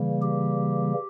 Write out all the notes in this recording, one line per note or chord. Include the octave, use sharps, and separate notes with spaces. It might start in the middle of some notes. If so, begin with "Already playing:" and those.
Already playing: C#3 E3 G3 A#3
G4